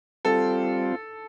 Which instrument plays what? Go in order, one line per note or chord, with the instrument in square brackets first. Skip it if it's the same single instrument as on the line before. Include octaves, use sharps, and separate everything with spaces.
[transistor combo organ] G3 C4 F4 [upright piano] A4